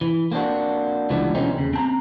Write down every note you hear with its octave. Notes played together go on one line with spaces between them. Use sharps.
E3
A#3 C4 D4 F#4
C#2 E3 F3 G3 B3 D4
B2 D3 E3 C4 C#4 D#4
D#2 C#3
C4 A5 A#5